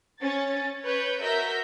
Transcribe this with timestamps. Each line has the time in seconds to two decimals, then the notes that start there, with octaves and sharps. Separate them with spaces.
0.21 C#4 A6
0.83 B4 C#5 G6
1.21 F#4 A#4 E5 A#5 G6 B6